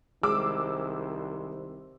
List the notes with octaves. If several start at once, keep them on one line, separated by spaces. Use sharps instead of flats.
C2 D#3 G#3 C5 D6 E6